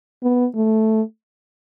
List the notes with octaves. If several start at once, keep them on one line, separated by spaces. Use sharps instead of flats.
B3
A3